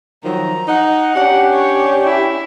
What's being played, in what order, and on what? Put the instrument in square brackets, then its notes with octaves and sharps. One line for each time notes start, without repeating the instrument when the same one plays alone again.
[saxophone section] D#3 F3 F#3 [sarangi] A#5
[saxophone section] D#4 F#5
[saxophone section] C#4 D4 G4 [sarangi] F#5
[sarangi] C#5
E4